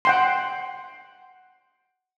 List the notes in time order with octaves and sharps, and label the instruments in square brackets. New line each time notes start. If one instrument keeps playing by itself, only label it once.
[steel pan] F#5 G5 C6